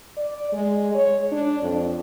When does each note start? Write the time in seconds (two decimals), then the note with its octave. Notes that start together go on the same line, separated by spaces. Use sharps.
0.17 D5
0.52 G#3
0.95 C#5
1.32 D4
1.62 F2